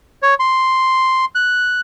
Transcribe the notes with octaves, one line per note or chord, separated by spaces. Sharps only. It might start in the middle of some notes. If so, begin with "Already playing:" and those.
C#5
C6
F#6